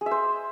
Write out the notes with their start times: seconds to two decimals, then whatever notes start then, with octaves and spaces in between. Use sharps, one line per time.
0.01 G#4
0.06 E5
0.11 C5